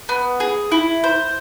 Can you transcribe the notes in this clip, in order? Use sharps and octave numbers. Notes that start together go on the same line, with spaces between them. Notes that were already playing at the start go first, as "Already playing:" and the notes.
B3
G#4
E4
C5